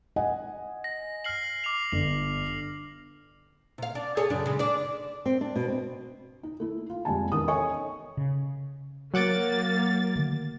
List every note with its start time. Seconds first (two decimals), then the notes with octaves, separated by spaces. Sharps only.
0.16 D#5 F#5 G#5
0.84 A#6
1.24 F6 C7 F#7
1.64 D6 C7 F7
1.92 G1 F7
3.78 C3 F5
3.95 D4
4.17 G#4 A4 C#5
4.30 F#2 C#3 D4
4.46 C#3 G#3
4.59 D4 D5
5.26 C4
5.41 D4
5.56 B2
5.68 C4
6.43 D#4
6.60 A3 E4
6.90 F4
7.05 F1 F2 G3 G#3 G#5 A5
7.32 A1 E2 D#3 D#6
7.48 A4 C#5 D#5 G#5 C#6
8.17 C#3
9.14 F#3 A#3 F#5 D6 A6
10.16 D3 D#3 A3